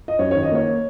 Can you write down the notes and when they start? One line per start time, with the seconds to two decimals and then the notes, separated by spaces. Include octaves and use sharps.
0.08 D#5
0.19 F#2 C#5
0.31 C#5
0.35 D#3
0.43 D#5
0.51 A#3 C#5